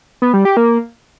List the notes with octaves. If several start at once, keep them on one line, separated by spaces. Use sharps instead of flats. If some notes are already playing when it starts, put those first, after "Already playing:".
B3
G3
G4
A#3